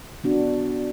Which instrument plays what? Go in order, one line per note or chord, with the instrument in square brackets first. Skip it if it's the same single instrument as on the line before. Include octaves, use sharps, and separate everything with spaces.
[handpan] B3 D4 F#4